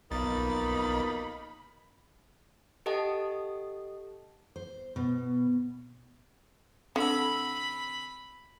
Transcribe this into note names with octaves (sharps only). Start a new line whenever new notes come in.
B1 F2 B2 A#3 D#4 A#4 B5 A6
G4 A4 D#5 F#5 A5
C5
B2
D3 C4 B5 E6